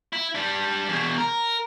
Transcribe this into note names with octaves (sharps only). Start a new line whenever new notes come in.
E4
G3 D4
E2 B2
A#4